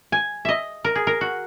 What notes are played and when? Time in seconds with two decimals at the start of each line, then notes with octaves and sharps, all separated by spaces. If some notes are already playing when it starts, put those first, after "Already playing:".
0.12 G#5
0.45 D#5 E5
0.84 A#4
0.95 G#4
1.07 A#4
1.21 F#4